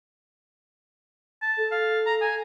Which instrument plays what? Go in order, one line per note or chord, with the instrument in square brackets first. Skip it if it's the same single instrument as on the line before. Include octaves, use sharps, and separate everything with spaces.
[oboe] A5
[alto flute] A4
[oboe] F5
A#5
G#5